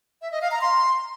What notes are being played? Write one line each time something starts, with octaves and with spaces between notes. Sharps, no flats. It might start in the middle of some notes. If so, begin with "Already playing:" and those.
E5
D#5
F5
A#5
C6